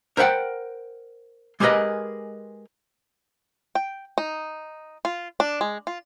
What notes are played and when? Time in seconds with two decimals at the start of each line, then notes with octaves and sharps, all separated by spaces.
0.17 A#4 C5 E5 F#5 G5
1.60 G#3 G4 G#4 A#4 B4 D#5
3.75 G5
4.18 D#4
5.05 F4
5.40 D4
5.61 G#3
5.87 F4